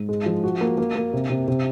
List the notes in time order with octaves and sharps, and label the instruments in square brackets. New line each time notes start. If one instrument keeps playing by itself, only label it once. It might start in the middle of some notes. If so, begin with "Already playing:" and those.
Already playing: [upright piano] G#2
G#3
F3
F#4
A#3
A#3
A#3
C3
C3
C3